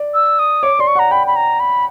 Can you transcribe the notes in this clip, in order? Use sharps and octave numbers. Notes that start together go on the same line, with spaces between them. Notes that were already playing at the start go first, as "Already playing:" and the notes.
Already playing: D5
E6
D#6
C#5 D6
D5 C6
C#6
F#5
A#5
G5 B5
B5
A#5
B5